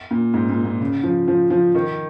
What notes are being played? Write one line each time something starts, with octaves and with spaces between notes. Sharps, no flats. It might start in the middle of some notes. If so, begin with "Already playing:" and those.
A#2
G#2
A#2
A#2
C#3
F3
F3
F3
D#3